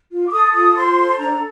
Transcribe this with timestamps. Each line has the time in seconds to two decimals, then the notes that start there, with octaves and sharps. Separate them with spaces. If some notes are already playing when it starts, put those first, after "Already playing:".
0.11 F4
0.28 D6
0.33 A4 D#6
0.53 F4 D#6
0.75 C5 C6
0.97 A4
1.18 D4 A#5